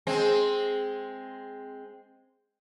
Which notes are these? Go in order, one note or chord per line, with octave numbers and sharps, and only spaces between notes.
G#3 C4